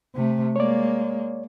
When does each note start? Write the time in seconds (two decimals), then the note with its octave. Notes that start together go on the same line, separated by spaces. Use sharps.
0.15 C3 A3
0.56 G#3 A#3 C#5 D5